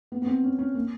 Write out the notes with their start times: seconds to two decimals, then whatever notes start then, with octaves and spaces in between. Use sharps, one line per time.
0.12 B3
0.22 B3
0.27 C4
0.44 C#4
0.59 C#4
0.75 A#3